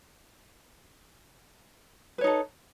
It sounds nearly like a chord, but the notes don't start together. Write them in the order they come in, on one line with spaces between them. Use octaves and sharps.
B4 C#5 D#4 A4